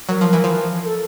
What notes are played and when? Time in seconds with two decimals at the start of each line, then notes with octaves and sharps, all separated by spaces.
0.09 F#3 A#4
0.21 F3
0.33 E3
0.44 F3
0.86 A4